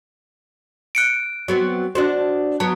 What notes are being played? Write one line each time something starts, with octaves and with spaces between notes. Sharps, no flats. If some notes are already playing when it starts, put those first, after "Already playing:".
F#6 C#7 D7
F#3 B3 C4
D4 F#4 C5
F#3 B3 A5